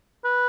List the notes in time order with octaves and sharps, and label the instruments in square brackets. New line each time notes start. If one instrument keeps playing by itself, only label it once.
[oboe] B4